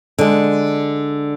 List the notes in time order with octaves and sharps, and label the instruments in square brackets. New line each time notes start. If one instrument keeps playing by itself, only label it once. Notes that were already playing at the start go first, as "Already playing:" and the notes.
[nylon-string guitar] D3 G#3